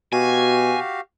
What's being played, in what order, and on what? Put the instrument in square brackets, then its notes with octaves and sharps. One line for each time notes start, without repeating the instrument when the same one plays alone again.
[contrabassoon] B2 [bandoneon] F#4 G4 F5 [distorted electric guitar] G#5